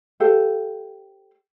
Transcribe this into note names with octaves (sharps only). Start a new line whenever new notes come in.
G4 A4 C5 F5